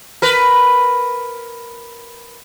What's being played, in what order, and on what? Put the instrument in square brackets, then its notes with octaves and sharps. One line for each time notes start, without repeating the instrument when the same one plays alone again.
[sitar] A#4 B4